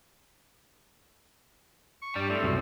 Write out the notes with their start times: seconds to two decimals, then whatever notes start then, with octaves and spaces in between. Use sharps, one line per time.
2.02 C#6
2.16 G2 G3 D5
2.29 A2 C4
2.43 C2 F#2 B2